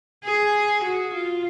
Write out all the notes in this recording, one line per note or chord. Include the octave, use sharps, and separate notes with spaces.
G#4
F#4
F4